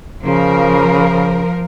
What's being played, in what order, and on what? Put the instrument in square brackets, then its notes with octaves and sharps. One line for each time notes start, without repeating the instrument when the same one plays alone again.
[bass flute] C#3 [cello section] F3 A#4